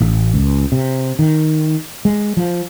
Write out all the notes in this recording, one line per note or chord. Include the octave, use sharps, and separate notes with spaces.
A1
C#2
C3
D#3
G#3
F3